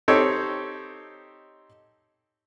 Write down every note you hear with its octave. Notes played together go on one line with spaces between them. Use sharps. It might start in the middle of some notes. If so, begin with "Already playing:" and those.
C4 D#4 G4 A4 C#5